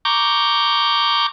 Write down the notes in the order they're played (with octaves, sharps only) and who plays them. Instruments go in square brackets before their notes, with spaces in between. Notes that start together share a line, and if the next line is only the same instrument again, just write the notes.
[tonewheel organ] A#5 C#6 D6 G6